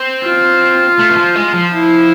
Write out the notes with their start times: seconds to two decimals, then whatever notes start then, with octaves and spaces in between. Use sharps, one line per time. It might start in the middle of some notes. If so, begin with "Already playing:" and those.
Already playing: C4
0.26 F4
0.99 A3
1.10 E3
1.18 F3
1.36 G#3
1.54 F3
1.73 E4